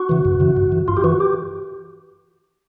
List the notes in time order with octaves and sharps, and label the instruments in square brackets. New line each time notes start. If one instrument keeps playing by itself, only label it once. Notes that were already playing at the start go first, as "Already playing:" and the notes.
Already playing: [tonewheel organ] F#4
C#3 E3
F#2
C#3 E3
G2
E3
G2 F4
G4
E3 F#4
G4